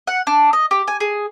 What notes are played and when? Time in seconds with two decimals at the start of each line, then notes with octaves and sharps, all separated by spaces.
0.07 F#5
0.27 D4
0.53 D#5
0.71 G4
0.88 G#5
1.00 G#4